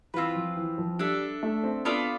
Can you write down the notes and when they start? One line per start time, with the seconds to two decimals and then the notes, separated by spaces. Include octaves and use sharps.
0.14 E3 C4 F4 B4
0.35 F3
0.57 E3
0.78 F3
0.99 G3 D4 A4 E5
1.43 A3
1.64 C4
1.85 B3 D4 F4 A4 D5